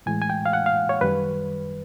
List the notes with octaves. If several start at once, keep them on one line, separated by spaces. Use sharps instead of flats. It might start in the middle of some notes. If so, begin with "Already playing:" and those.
A2 E3 G#3 G#5
G#5
G5
F5
F#5
F5
C#5
F#2 D#3 G3 B4